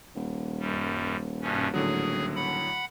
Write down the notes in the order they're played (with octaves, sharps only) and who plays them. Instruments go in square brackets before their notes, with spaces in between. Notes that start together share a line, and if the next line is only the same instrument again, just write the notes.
[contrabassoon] D#1
[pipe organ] F#2 G3
G2 B2 C#4
[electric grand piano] A2 D3 F#3 [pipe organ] G#4
[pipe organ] F#5 B5